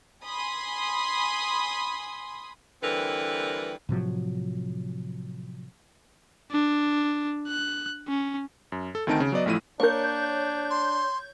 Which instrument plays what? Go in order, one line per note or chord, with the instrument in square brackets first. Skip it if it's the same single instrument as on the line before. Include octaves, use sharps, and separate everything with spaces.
[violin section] G#5 B5 C6 D#6
[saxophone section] D3 E3 G3 C4 A#4 B4
[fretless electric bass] A2 C3 F3 F#3
[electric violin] D4
F#6
C#4
[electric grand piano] F#2
A4
D2 D#3 C4 D#4 A5 D7
C#3
F#3 B3 D5 D#5
A1 F3 A3 E4 D#7
[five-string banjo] A#3 A#4 [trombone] D4 [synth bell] C#5 G6
[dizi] C6